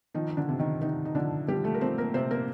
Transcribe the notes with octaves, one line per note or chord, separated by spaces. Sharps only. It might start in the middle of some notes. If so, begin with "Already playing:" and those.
D#3 F3 D#4
D#4
D3 D4
C3
D#3 D#4
C3 D#3 D#4
D#4
D3 F3 D4
F3 G3 G4
A3 A4
A#4
F3 C4 C5
A#3 A#4
C3 C4 C5
A#3 A#4